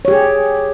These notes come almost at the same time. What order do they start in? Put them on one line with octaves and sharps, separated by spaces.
C#5 G4 G#4